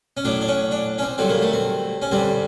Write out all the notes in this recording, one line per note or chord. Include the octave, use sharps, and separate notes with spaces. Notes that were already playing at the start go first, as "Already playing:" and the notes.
C#4
A2 F#3 D4
D4
C#4
D4
C#4
C4
G2 D3 F#3 C4
A#3
A3
C4
C#4
G2 D3 G3 C4